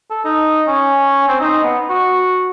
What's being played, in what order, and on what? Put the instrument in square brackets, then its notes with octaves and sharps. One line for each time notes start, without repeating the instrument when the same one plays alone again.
[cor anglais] A4
D#4
C#4
C4
D#4
B3
F#4